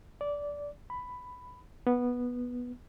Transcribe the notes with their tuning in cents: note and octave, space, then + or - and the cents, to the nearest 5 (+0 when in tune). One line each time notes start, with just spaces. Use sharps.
D5 -15
B5 +10
B3 -10